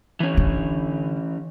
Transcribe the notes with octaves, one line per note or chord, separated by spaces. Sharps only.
E3 C#4
D3